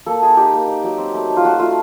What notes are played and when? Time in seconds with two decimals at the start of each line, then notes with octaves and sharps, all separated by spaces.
0.06 A#3 A4
0.22 D#4 G#4
0.37 D#4 G4
0.53 A#3
0.67 D#4
0.83 F#3
0.98 C4
1.13 A3
1.30 D#4
1.37 F4
1.44 A3 F#4
1.59 A3 F4